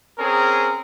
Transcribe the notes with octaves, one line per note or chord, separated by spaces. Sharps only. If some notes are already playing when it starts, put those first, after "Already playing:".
C4 C#4 G#4 A#4